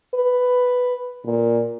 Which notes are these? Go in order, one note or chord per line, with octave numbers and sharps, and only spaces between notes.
B4
A#2